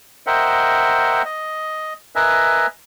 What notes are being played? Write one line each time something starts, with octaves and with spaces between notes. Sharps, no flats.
A#4 C5 D#5 E5 F#5 G5
D#5
A#4 B4 D#5 E5 G#5